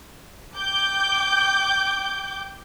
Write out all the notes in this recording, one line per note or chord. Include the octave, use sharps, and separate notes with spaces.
G5 D6 G6